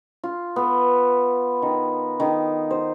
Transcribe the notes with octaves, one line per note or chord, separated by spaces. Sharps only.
F4
B3
D#3
D#3
C5